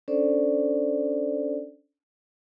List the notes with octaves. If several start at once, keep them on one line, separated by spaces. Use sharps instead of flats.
C#4 D4 A4 C5 D5